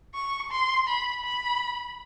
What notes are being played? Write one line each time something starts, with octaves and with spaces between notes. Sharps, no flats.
C#6
C6
B5
B5